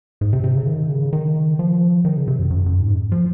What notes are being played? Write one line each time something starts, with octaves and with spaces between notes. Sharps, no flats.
G#2
C3
C3
C#3
D#3
C#3
D#3
F3
D#3
C#3
C3
F#2
F#2
F#2
G#2
F3